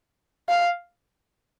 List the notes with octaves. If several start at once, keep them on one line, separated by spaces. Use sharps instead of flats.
F5